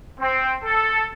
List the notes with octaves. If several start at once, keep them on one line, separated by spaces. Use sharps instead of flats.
C4
A4